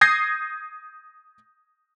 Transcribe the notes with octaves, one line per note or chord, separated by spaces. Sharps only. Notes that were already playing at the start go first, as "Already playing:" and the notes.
D#6 G6 G#6 A#6 C7